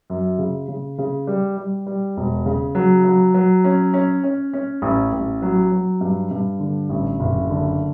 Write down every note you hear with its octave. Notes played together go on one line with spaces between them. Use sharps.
F#2
C#3
C#3
C#3
G3
G3
G3
E1
C#3
F#3
F#3
F#3
C#4
C#4
C#4
C#4
A1
A1
F#3
F#3
G2
G2
D3
A1
F#1
D3